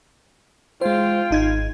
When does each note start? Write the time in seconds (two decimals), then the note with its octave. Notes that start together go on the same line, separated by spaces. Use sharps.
0.81 G#3 F4 C5 G5
1.31 G#1 D#4 G#6